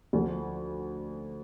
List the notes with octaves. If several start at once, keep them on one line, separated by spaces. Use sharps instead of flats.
D2 D3 F3